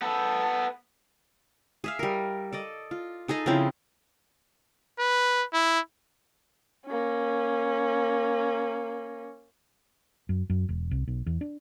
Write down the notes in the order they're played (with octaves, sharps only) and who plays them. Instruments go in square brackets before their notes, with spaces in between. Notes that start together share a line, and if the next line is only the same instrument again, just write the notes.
[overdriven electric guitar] B3 A4
[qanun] G#4 E5 F5
G3 A#4
A4 D5 D#5
F4
D#4 G#4 A4 D#5
C#3 F3 C4 E4
[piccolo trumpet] B4
E4
[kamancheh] A#3 C#4
[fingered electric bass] F#2
F#2
E1
C2
B1
E2
D4